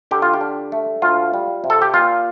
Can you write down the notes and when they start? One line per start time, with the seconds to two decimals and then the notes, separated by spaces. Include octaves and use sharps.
0.11 D3 G4
0.22 F4
0.34 G4
0.41 D4
0.72 A3
1.02 D2 F4
1.34 G3
1.64 C3
1.70 A4
1.82 G4
1.94 A#2 F4